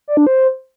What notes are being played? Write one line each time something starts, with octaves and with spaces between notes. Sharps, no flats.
D5
D4
C5